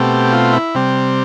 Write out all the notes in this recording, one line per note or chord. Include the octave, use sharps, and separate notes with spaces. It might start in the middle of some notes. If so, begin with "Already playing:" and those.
Already playing: B2 A3 C4 G4
F4
E4
C3 G3 C4